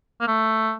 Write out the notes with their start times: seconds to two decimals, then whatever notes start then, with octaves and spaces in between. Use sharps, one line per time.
0.20 A#3
0.27 A3